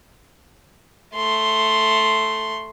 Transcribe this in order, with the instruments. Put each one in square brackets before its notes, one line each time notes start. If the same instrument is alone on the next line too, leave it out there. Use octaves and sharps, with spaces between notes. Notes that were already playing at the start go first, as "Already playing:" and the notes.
[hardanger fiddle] A3 C6